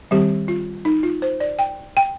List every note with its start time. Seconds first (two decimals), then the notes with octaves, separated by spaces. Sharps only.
0.11 D#3 G3 C4 G4
0.48 F4
0.85 D#4
1.03 F4
1.22 C5
1.40 D5
1.59 G5
1.97 G5